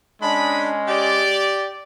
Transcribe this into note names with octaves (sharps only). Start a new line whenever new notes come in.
G#3 C#4 D4 D#5 B5
G4 D5